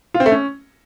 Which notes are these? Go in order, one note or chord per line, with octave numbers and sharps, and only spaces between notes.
F4
C4
A3
C#4